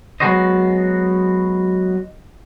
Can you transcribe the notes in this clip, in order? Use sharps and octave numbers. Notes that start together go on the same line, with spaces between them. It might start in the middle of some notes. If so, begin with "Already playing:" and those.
F#3 G#3 B3 F#4 C5 D#5